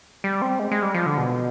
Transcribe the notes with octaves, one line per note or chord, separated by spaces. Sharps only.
G3
C4
G#3
G#3
G3
F3
D3
B2